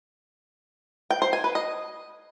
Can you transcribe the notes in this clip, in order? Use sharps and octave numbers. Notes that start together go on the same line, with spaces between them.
G5
C5
G#5
B4
D#5